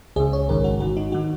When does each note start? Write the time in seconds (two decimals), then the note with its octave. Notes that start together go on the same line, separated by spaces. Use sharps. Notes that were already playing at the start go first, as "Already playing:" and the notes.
0.16 C#2 C#3 G#4
0.33 C#5
0.48 A#1 G#2 D#3 A#4
0.64 F#4
0.80 G#1 G#2 D#3 F#4
0.97 D#4
1.12 D#3 F#4